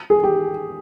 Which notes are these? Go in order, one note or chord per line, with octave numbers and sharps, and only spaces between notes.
G#4
G4